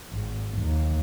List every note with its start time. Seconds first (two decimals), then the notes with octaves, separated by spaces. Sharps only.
0.11 G#1
0.58 D#2